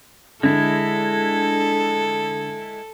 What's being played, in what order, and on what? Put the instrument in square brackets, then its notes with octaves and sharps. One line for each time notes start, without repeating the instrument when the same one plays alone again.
[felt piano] D3 [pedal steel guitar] G#3 E4 [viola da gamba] A4